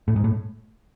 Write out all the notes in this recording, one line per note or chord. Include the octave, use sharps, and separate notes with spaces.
A2
G#2
A2